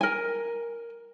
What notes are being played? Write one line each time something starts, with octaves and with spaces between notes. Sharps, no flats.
A#4 G#5